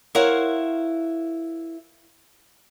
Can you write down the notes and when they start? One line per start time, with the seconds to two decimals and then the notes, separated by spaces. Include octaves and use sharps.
0.15 E4 A#4 C5 C#5 F5 F#5